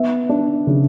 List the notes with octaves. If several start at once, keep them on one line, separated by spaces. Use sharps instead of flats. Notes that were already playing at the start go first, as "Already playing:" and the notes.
Already playing: B3 E5
D4
C#3